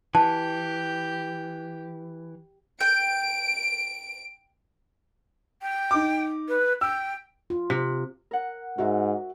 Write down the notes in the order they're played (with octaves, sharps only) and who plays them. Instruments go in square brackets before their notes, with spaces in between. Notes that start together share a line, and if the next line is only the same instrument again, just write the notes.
[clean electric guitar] E3 [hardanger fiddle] G4 [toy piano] A5
[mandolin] G5 [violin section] D7
[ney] G5
[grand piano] D#4 D6
[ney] B4
[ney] G5 [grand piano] E6
[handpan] F4
[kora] C3
[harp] A#4 F#5
[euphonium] G#2 [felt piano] F#4 E5